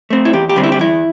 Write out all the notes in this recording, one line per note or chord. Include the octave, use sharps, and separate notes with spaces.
A3 C4
E4
E2 G4
G4
D3 G3 C4
E4
G4
E2 E4